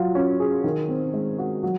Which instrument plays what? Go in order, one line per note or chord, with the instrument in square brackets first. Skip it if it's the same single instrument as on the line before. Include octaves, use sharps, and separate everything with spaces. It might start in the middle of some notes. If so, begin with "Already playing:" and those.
Already playing: [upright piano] F#3 F4
C#4
G#4
D#3
C4
G#3
F#4
F#3